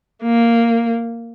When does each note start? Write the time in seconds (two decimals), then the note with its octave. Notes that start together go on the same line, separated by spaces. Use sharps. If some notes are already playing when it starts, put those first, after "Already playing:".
0.23 A#3